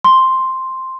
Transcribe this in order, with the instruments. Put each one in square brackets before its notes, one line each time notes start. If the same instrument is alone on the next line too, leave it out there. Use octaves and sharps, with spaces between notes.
[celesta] C6